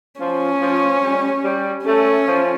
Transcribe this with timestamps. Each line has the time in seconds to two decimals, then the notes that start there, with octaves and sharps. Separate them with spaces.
0.20 F3 C#4
0.61 F3
1.02 G3
1.44 G3
1.85 A3 C#4
2.27 F3